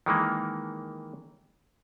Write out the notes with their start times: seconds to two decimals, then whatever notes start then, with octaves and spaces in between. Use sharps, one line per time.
0.06 D#3 E3 G#3 A#3